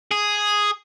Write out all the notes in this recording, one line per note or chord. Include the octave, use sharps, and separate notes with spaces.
G#4